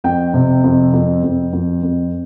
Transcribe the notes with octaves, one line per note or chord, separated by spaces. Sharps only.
F2 G5
C3
F2
F2
F2
F2
F2